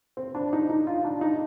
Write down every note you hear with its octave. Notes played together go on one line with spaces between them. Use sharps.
C4
D4
D#4
D#4
F4
D4
D#4